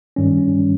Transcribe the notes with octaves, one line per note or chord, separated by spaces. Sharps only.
G2 D#3 G3 C#4